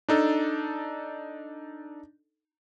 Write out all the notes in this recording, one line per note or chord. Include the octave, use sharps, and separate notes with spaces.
D4 D#4 A4